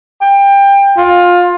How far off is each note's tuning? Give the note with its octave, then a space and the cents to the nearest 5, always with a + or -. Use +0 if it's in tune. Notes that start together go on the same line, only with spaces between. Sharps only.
G5 +25
F4 +20